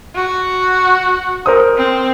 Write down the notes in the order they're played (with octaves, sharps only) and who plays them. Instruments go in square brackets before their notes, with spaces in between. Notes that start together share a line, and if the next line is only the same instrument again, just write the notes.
[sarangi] F#4
[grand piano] A#4 C5 D#6
[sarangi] C4